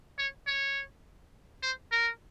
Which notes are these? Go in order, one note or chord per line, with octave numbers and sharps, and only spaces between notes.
C#5
C#5
C5
A#4